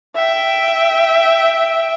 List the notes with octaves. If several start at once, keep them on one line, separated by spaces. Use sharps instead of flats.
E5 G5